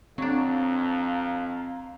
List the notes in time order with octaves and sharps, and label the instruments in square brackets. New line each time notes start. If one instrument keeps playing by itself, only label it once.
[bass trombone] F2 [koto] F#3 D4 [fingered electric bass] C4 [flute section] F5 A#5